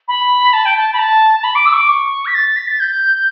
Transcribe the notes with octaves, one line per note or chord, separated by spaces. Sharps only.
B5
A5
G5
A5
B5
A5
A5
B5
D6
E6
C#6
D6
C#6
B6
A6
B6
A6
G6